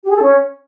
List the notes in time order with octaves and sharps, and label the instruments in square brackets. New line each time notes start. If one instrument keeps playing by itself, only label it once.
[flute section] G4
G#4
A4
C#4